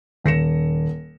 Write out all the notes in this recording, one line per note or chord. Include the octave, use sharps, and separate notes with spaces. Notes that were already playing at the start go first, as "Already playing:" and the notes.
D#1 A#6 C#7 E7